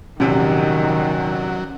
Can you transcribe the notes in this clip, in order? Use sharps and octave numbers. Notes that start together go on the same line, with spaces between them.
A#1 E2 C3 D#3 F#3 C#4